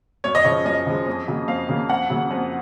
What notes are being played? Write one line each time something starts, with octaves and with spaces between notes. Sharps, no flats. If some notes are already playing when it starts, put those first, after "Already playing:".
F#2 C#5
D#5
C#3 F3 G#3 C#5
F#2 D#5
C#3 F3 G#3
F2
C#3 F#3 A#3
F2 F5
C#3 F#3 A#3
F2 F#5
C#3 F#3 A#3
F2